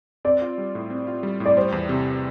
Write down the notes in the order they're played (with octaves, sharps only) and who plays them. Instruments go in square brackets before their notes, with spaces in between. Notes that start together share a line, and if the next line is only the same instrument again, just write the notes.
[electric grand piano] C4 [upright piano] D5
[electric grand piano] F4
G3
A2
C4
F4
G3
A2
[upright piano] D5
[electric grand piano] G3 [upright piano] C5
[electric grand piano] E2
C3